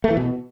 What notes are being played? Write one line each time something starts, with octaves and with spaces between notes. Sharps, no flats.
A3
E3
B2